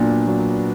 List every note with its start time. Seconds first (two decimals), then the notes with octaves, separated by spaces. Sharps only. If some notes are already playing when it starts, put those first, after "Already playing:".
Already playing: A#2 F#3 B3 D4
0.27 F#3